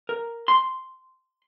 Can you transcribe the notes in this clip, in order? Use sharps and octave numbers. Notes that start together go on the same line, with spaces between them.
A#4
C6